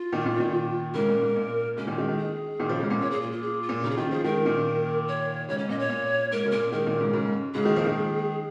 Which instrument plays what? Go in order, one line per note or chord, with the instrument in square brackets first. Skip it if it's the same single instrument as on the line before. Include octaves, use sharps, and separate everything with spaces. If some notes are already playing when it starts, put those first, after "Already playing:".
Already playing: [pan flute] F4
[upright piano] A#2 D#3
A#2 D#3
A#2 D#3
[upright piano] G#2 C#3 [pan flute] A#4
[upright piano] A#2
G#2
A#2
[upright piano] G#2 C#3 [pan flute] C#4
[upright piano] A#2 D#3
D#3 G#3
D#3 G#3
[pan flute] G#4
[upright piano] A#2 D#3
C#3 F3
G#2 C#3
A#2
[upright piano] A#2 [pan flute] C#5
[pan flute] G#4
F4
F4
G#4
F4
[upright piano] A#2
[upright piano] C#3 [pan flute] D#4
[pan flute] G#4
[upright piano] D#3 [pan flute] F4
[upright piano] F3 [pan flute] G#4
[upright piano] D#3 G#3 [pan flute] A#4
[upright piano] A#2 D#3
[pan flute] C#5
[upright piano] G#2 C#3 [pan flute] C#5
[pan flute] C#4
[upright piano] A#2 [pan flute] D#5
[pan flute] C#5
[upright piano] A#2
[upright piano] G#2 [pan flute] A#4
[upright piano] C#3
[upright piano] A#2 [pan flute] A#4
[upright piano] D#3 G#3 [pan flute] A#4
[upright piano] A#2 D#3
G#2 C#3
G#2 C#3
[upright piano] G#2 C#3 [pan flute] G#4
[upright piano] D#3 G#3
F3 A#3
D#3 G#3